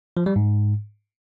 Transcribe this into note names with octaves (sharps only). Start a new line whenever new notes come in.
F3
G3
G#2